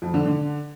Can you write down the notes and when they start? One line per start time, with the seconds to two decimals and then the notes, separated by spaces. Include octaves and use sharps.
0.02 F2
0.14 D3
0.26 D3